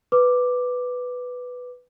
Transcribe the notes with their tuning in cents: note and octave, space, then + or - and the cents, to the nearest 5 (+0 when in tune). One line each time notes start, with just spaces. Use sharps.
B4 +5 D6 +0